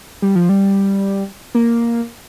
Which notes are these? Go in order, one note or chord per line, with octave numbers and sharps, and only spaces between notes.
G3
F3
G3
A#3